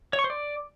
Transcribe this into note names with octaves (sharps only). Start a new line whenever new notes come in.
C#5
C#6
C5
D5